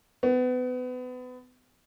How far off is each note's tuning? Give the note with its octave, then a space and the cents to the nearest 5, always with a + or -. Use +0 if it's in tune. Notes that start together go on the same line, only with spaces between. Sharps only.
B3 +30